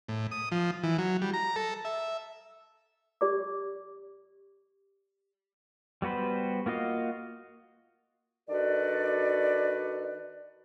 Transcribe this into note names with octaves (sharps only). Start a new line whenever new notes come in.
A2
D#6
F3
E3
F#3
G3
A#5
A4
E5
G4 D5 D6
G3 B3 F#4 B4 C5
A#3 F4 F#4 D#5 F5
D#3 D4 F#4 A4 B4 D5